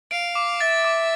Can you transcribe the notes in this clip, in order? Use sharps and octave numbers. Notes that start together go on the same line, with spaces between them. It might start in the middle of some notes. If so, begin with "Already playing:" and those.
F5 D7
D6
E5 A6
D6